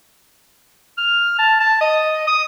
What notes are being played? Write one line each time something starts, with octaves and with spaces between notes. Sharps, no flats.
F6
A5
A5
D#5
D#6